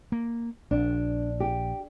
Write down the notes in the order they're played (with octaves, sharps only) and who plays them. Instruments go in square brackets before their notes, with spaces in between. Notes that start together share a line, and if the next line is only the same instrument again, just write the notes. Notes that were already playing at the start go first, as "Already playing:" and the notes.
[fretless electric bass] A#3
[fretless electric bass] A#1 [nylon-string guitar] D4
[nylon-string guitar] G4